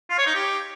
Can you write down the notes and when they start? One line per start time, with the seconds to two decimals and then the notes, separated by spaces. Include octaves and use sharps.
0.09 F4
0.18 C#5
0.26 D#4
0.35 G4